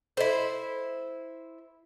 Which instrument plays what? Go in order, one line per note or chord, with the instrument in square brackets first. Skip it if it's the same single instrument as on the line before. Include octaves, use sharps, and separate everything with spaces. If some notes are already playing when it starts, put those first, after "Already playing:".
[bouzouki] E4 C5 [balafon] A4 D#5